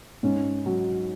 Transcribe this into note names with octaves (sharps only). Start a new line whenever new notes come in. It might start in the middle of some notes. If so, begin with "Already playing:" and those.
G#2 C#4
F#3